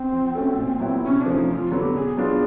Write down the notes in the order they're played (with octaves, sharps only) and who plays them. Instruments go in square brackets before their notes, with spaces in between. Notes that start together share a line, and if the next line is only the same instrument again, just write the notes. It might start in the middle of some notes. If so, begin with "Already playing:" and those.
Already playing: [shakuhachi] C4
[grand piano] F3
A3 C#4 F#4 A4
A#2
F#3 B3 E4
[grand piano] C3 [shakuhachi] C#4
[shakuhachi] D4
[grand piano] F3 A3 C#4
[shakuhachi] D#4
[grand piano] F2 [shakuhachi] F4
[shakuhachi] F4
[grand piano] D3 F#3 B3
[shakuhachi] G4
[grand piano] B2 [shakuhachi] G#4
[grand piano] F#3 B3 D4 F4